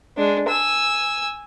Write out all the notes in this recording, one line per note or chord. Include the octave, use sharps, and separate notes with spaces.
G#3 D4
G#5 E6